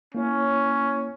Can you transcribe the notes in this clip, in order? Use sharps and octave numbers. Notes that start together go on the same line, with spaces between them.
A#3 C#4 E4 C#5